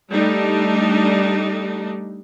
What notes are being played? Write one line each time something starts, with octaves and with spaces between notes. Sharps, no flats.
G3 A3 D4 D#4